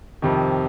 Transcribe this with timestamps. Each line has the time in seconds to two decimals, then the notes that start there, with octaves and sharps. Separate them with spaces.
0.22 F2 C3 D#3